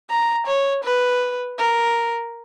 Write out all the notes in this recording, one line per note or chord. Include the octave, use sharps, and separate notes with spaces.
A#5
C#5
B4
A#4